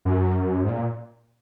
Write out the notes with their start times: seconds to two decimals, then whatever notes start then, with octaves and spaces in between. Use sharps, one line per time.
0.05 F#2
0.64 G#2
0.69 A#2